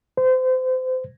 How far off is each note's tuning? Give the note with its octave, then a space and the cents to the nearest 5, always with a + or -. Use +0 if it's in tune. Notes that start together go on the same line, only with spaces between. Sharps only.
C5 -30